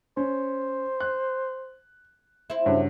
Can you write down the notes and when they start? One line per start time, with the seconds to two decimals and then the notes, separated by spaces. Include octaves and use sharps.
0.17 C#4 C5
1.00 F#6
2.50 C4 E4
2.66 G2 C#3 F#3